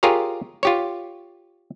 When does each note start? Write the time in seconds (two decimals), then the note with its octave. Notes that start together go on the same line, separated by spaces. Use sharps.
0.03 F4 G4 G#4 A#4 C#5
0.63 F4 G4 C#5